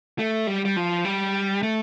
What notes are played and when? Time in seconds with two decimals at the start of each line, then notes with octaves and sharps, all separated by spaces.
0.19 A3
0.47 G3
0.65 G3
0.76 F3
1.05 G3
1.63 A3